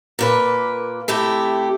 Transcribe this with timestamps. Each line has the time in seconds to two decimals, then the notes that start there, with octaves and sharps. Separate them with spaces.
0.19 A#2 A#3 B4
1.08 C3 A3 E4 G4